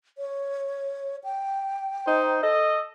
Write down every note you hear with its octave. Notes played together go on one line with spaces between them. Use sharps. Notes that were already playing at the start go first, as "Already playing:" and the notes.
C#5
G5
D#4 C5
A4 D#5